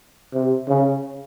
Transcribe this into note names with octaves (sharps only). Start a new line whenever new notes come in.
C3
C#3